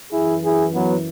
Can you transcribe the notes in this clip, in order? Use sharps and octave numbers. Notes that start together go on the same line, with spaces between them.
F#2 E3 E4 G#4
E4 G#4
F#3 B3